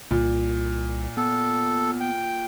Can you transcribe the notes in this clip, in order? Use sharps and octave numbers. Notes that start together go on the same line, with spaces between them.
C2 A#2
B3 A4
G5